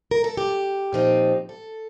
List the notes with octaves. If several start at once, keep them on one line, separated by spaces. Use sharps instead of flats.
A#4
A4
G4
A#2 F3 C4 D#4
A4